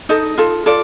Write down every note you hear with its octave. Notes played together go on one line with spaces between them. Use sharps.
D#4 A4 D#5
F4 A4
F4 A4 D5